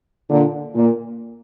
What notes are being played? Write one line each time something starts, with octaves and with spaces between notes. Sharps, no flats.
A#2 D3
A#2